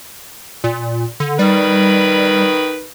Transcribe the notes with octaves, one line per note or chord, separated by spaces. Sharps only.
A#2
D3
D#3 G3 B4